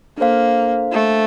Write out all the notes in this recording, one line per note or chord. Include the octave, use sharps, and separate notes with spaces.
A#3 D4 A4 C5 F5
A3